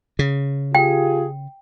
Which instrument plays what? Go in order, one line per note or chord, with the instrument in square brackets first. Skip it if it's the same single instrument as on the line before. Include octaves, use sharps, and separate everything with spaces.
[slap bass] C#3
[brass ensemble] F4 G4 G#4 [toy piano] G5